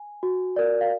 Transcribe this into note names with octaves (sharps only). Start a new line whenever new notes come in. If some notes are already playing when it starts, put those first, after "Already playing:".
Already playing: G#5
F#4
A#4 D5
F5